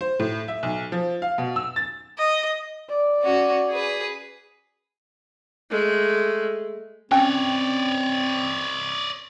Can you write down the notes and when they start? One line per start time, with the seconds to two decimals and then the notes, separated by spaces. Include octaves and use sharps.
0.01 C5
0.20 A2
0.48 E5
0.63 B1
0.92 F3
1.22 F5
1.38 B2
1.56 E6
1.76 A6
2.18 D#5
2.89 D5
3.22 C#4 F#4
3.70 G#4 B4
5.70 G#3 A3
7.12 C4 C#4 C#5 D5 G5